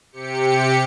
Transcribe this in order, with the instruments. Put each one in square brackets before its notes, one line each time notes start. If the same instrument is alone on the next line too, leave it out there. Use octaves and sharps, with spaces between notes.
[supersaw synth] C3 G4 C#7